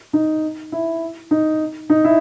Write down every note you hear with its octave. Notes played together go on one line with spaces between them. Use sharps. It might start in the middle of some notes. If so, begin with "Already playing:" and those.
D#4
E4
D#4
D#4
E4